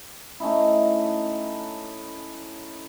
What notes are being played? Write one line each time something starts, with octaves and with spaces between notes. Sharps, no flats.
A3 C#4 D#4 E4